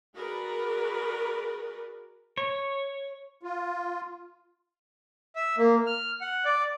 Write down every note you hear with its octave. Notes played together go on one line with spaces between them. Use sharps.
F#4 G#4 A#4 B4 D5
C#5
F4
E5
A#3
F6
F#5
D5